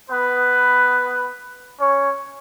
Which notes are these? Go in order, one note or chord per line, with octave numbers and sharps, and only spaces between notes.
B3 B4
C#4 C#5